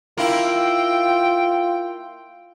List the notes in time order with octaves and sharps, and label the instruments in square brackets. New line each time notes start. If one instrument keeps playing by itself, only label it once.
[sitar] A#3 E4 [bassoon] F4 [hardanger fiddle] G5